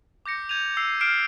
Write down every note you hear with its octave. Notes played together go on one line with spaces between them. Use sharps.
D6 G6 A#6 C#7
G6 G#6 D#7 F7
E6 C7 F7
F6 C7 D7 E7